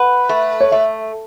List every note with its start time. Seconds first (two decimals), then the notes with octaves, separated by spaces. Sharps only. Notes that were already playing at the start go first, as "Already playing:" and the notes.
Already playing: B4 F#5
0.29 A3
0.61 C#5
0.72 A3 E5